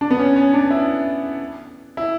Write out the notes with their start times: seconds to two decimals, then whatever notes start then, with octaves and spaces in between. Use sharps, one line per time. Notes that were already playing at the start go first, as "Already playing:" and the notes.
0.01 D4
0.10 B3
0.19 C#4
0.36 C#4
0.54 D4
0.71 E4
1.97 E4